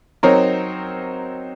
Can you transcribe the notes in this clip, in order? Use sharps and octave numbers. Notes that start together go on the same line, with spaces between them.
F#3 C4 D#4 A#4 C#5